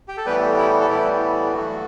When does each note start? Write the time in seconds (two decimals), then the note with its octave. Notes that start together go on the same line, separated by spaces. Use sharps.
0.08 G4
0.17 A4
0.26 A2 E3 G3 B3 G4 B4
0.57 E4 G4
0.80 A4
0.89 A2 E3 G3 B3 E4 G4
1.53 G2 F#3 A3 F#4